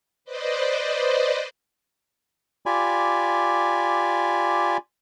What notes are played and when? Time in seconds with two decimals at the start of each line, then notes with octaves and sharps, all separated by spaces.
0.25 B4 C5 D5 D#5
2.66 F4 G4 D5 G#5 B5